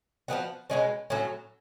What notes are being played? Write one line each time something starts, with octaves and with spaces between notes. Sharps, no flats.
F3 G#3 B3 F#4
B2 G#3 C#4
A2 F#3 C#4